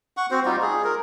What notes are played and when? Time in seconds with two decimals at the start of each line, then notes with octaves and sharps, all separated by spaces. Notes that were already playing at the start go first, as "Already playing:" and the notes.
0.17 F#5 C#6
0.31 C4 F#4 C5
0.45 G3 D#4 F4 G4
0.62 G#4
0.84 A#4